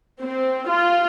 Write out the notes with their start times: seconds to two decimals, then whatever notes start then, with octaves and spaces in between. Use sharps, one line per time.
0.22 C4
0.69 F4